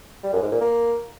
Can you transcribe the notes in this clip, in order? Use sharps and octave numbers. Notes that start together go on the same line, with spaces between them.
G3
F#2
G#2
A#2
A#3